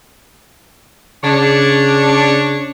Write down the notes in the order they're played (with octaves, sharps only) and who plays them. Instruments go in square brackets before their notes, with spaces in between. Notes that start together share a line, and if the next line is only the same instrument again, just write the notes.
[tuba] C#3 [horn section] D4 C#5